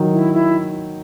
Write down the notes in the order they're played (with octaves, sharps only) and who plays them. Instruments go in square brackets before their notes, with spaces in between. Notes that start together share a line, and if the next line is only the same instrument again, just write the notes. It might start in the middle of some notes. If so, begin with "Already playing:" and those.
Already playing: [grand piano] D#3 F#3
[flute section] E4
E4